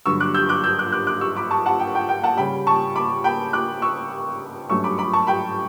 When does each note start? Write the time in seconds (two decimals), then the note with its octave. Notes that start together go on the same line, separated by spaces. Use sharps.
0.06 G2 D3 F#3 C#6 E6
0.20 D6 F#6
0.34 E6 G6
0.49 D6 F#6
0.64 E6 G6
0.79 D6 F#6
0.92 D6 F#6
1.07 D6 F#6
1.21 C#6 E6
1.36 B5 D6
1.51 A5 C#6
1.66 F#5 A5
1.79 G5
1.95 G5
2.09 G5
2.23 F#5 A5
2.37 C#3 G3 C#4 G5 B5
2.67 A5 C#6
2.96 B5 D6
3.24 G5 B5
3.53 D6 F#6
3.82 C#6 E6
4.69 G2 F#3 A3 C#4 C#6 E6
4.84 B5 D6
4.98 B5 D6
5.13 A5 C#6
5.27 G5 B5